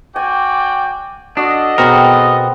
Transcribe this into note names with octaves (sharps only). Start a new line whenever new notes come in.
F#4 D5 G5 G#5
D4 F#4 A4 D#5
B2 B3 C4 F#4 G#4 A#4